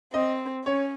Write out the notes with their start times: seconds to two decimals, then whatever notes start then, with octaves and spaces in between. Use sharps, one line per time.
0.14 C4 D#5
0.65 C#4 C#5